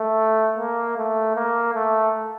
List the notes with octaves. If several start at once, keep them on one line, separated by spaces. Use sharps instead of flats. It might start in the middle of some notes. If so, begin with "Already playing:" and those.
Already playing: A3
A#3
A3
A#3
A3